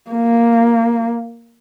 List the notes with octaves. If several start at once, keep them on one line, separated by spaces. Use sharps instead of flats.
A#3